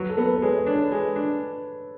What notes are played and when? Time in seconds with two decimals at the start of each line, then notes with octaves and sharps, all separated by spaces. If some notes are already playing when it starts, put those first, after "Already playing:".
Already playing: F#3 B4
0.09 A4
0.17 B3
0.26 B4
0.36 B4
0.42 G#3 C#5
0.58 C#5
0.66 D4
0.75 B4
0.92 G#3
1.16 D4